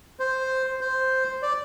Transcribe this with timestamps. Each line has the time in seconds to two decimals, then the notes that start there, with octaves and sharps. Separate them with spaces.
0.20 C5
0.81 C5
1.42 D5